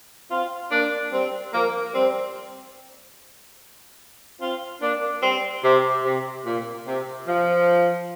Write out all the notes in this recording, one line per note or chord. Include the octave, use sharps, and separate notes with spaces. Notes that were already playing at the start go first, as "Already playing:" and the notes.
C4 F4
A#3 D4
G3 C4
F3 A#3
G3 C4
C4 F4
A#3 D4
G3 C4
C3
C3
A#2
C3
F3